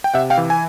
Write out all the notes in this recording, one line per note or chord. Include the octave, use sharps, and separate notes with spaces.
G5
C3 E5 F#5
F5 G5
E3
G#5